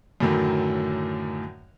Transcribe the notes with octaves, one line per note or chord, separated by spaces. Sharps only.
F#2 A2 D3 D#3 F#3